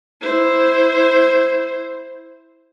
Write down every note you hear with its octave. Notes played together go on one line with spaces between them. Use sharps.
E4 C5